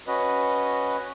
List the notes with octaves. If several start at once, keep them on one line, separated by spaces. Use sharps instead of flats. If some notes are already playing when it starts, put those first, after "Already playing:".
C#4 F#4 B4 D#5